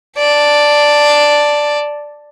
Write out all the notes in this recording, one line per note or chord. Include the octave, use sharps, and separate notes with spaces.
D5 A5